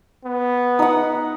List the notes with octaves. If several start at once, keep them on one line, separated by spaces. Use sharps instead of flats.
B3
D#4 F#5